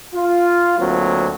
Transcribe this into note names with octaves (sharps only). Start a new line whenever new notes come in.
F4
D2 F#3 A#3 C4